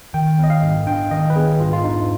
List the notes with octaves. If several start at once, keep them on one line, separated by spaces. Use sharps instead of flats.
D#3 G5
B3 D#5
F5
G#2
D4 G5
D#3 D#5
B4
B3 G#4
G#2 F4
F4
D4 D#4